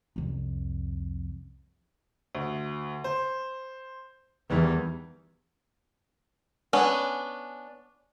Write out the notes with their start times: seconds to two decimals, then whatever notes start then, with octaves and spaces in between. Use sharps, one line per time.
0.16 C2 F2
2.35 D2
3.04 C5
4.50 E2 D#3 E3 G3
6.73 B3 C#4 D4 G#5